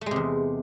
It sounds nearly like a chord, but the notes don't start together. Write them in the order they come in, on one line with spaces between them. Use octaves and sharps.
A3 G#3 C3 E2